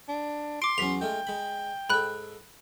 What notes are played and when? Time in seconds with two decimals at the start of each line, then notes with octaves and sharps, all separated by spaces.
0.09 D4
0.62 C6 D6 D7
0.78 E2 F#3 C#4 B6 F7
1.01 G#3 A3 F4 G5
1.27 G#3 B5
1.90 G#2 A4 B5 F#6